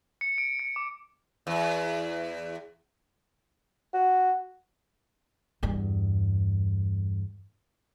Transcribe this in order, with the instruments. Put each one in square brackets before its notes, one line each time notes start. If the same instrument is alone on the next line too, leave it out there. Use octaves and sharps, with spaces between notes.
[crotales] C#7
D7
C#7
D6
[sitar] E2
[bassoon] F#4
[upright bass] E2 G2